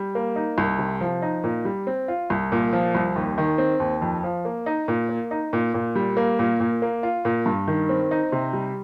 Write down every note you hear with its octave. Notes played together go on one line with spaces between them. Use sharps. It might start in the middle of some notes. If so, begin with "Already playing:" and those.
Already playing: G3
A#3
D#4
C2
C3
F3
D#4
A#2
G3
C4
F4
C2
A#2
F3
C2
D#2
D#3
C4
D#2
F2
F3
A#3
D#4
A#2
A#3
D#4
A#2
A#2
G3
A#3
A#2
A#2
A#3
F4
A#2
G2
D#3
C4
D#4
C3
G3